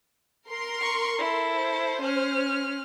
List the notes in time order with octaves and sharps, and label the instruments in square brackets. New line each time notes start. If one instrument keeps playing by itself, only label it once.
[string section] A#4 C6
[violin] C#6
E4 A4
[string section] C5
[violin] C#4 F6